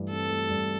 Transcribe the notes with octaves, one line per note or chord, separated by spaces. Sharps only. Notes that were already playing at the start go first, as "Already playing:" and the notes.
Already playing: G2 E3 A3
C4 A4
A3
G2